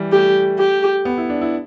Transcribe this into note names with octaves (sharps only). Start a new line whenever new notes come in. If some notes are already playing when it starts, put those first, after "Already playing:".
Already playing: E3 G3
A3 G4
G4
B3
E4
D4
E4